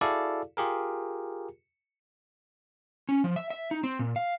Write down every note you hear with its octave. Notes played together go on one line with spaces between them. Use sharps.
E4 F#4 G#4 A4 D5 F5
F4 G4 G#4 A#4
C#4
F3
E5
E5
D#4
C4
A#2
F5